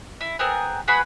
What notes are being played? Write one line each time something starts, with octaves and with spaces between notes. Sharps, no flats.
E4
B3 C4 G#4 A#4
F#4 G#4 B4 B5